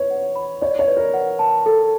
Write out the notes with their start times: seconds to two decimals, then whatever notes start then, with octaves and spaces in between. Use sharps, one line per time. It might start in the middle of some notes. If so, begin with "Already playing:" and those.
Already playing: B4 C#5
0.10 F#5
0.36 B5
0.61 C#5 D5
0.79 C#5
0.88 B4
0.97 A#4
1.14 F#5
1.39 A5
1.66 A4